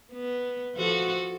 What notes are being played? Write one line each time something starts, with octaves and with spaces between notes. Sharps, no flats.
B3
F3 F#4 A4